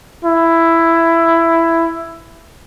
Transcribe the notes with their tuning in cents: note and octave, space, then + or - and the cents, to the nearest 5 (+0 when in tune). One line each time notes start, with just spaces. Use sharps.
E4 +10